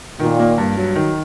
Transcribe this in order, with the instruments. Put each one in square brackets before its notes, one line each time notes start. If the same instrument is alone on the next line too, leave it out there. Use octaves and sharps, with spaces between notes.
[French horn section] A#2 [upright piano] D#3
[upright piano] A#3
G2
F#3
D#3